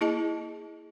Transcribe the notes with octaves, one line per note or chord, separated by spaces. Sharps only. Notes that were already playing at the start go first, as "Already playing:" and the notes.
A#3 E4 G#4 D#5 A5